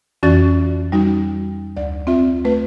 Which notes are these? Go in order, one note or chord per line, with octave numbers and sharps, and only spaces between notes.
F2 E3 C#4 F#4 D5 A6
G3 D#4 F#4
D2 D5
C4 F4 E5
A3 B4